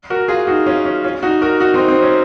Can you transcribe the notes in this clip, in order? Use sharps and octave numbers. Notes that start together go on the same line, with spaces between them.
F#4 A#4
F4 G#4
D#4 F#4
C#4 F4
C#4
C#4 F4
D#4 F#4
F#4 A#4
D#4 F#4
C4 D#4
C4
C#4